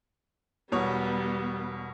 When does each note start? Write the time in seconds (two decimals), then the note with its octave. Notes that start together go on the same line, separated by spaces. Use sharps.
0.72 E1 B2 G3 B3 C#5